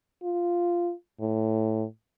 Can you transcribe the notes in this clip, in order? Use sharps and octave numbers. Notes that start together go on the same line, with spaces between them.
F4
A2